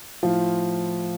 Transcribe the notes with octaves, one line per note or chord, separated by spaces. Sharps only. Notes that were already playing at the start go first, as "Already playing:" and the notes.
A2 F3 F4